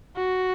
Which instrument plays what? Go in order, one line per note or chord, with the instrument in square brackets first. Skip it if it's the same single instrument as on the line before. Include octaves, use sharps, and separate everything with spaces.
[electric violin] F#4